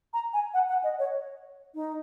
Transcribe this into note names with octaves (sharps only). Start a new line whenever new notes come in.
A#5
G#5
F#5
F#5
D#5
C#5
D#4